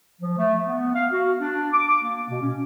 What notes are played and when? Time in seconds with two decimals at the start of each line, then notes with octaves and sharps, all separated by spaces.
0.21 F3
0.37 A3
0.66 B3
0.94 F5
1.12 F#4
1.39 D4
1.72 D6
2.02 A#3
2.29 B2
2.41 C#4